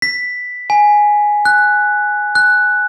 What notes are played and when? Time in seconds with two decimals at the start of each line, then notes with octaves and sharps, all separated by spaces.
0.02 B6
0.70 G#5
1.45 F#6
2.35 F#6